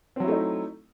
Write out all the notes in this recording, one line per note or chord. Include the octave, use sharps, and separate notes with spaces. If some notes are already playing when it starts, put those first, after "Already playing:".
F#3 A3 C4 D#4 E4